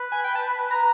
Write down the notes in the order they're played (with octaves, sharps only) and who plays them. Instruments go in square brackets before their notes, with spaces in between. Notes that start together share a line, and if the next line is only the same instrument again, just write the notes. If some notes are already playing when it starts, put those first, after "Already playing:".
Already playing: [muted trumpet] B4
[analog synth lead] G#5
G5
A5
A#5